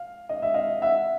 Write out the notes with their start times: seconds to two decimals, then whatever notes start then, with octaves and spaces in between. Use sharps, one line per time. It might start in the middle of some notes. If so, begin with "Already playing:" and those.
Already playing: F5
0.29 D#5
0.42 E5
0.54 D#5 F5
0.82 E5 F#5